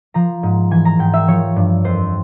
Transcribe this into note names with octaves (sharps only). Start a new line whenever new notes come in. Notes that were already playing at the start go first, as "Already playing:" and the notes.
F3 A#5
G#2
E3 G#5
A#5
G#2 G5
E5
F3 C#5
G2
F2 C5